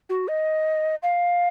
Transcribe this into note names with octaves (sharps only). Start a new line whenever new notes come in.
F#4
D#5
F5